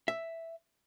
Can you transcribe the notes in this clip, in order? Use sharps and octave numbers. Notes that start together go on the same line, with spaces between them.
E5